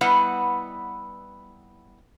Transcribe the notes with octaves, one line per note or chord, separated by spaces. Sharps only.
G3 B3 E4 B4 D#5 F#5